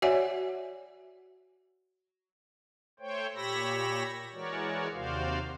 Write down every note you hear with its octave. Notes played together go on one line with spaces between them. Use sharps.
F#4 C#5 D5 E5 F#5 G#5
A3 C5 C#5 G5
A#2 G4 C#5 B5 E6 A#6
E3 G#3 F#4 A#4 C#5 D5
D#2 C3 F#4 C5 D5 F5